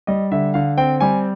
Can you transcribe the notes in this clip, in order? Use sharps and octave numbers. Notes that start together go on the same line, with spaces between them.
G3 D#5
D3 E5
D3 F5
C4 G5
G3 G#5